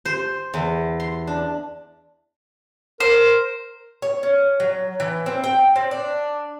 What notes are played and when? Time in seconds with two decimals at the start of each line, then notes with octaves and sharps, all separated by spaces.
0.05 C5
0.54 E2
1.00 C6
1.27 D4
3.00 A#4 C5
4.02 C#5
4.23 C#4
4.60 F#3
5.00 E3
5.26 C4
5.44 G5
5.76 C4
5.91 D4